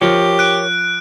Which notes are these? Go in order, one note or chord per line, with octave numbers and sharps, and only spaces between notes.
F3 G4 A#4 C#5
F#6 D7